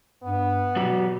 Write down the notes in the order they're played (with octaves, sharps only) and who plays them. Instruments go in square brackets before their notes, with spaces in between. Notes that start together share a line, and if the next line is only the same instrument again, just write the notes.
[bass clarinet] G2 [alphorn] B3
[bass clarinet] B2 [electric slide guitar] F#3 F#4 G4